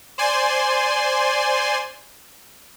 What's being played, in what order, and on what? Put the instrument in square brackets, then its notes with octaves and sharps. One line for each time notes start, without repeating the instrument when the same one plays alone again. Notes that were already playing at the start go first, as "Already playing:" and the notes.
[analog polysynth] C5 D5 G#5 C6